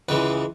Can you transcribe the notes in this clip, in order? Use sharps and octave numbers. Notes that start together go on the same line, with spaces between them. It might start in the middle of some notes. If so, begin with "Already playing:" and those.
C#2 C#3 E3 G#3 B4